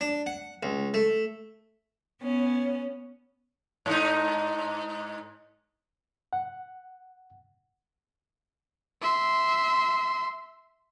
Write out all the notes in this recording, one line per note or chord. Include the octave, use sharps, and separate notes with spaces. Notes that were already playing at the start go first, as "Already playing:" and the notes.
D4
F#5
C#2
A3
B3 C#4
G#2 D#4
F#5
E5 C6